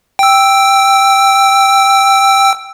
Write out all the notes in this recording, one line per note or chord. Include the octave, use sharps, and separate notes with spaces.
G5 E6